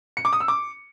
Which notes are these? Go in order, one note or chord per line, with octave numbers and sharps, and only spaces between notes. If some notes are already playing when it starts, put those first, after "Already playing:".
C#7
D6
D#6
E6
D6